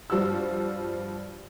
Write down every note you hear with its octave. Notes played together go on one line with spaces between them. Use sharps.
G2 F3 G3 F#4 E6